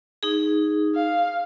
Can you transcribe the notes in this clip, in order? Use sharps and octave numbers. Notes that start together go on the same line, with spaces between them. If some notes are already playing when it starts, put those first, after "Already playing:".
D#4 G#4
F5